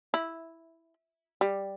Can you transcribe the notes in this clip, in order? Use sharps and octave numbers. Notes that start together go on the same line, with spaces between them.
E4
G3